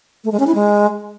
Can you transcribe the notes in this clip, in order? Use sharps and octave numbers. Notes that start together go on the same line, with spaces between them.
A3
G#3
C#4
E4
G#3